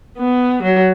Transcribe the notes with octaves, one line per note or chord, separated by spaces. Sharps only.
B3
F#3